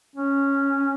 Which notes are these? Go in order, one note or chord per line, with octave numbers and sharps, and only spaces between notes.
C#4